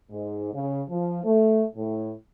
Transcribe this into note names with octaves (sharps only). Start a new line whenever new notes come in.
G#2
C#3
F3
A3
A2